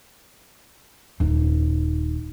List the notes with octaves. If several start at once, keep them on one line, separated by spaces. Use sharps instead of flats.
D#1 D#4